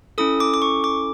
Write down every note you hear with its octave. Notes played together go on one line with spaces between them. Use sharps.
C#4 E4 A4 D#6
D6
D6
C#6
D6